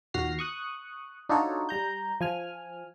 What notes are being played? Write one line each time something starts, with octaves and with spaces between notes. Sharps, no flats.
D#2 A#2 F#4 F6 A#6 C7
C#6 D#6 F#6
D4 D#4 F4 F#4 A4 C#5
G3 A#5 G6
F3 G#5 F6